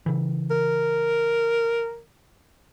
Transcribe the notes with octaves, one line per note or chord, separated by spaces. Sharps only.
C#3 E3
A#4